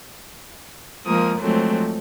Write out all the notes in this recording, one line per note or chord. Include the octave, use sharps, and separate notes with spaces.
F3 G#3 A#3 A#4 D#6
F3 F#3 G#3 A3 C4